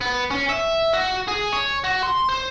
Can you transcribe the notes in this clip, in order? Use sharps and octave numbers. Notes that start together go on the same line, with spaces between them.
B3
C#4
E5
F#4
G#4
C#5
F#4
C6
C5